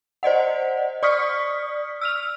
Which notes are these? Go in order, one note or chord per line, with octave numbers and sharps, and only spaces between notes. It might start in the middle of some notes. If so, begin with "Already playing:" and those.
C5 D5 D#5 F#5
D5 C#6 D#6 F6 B6 C#7
E6 F6 F7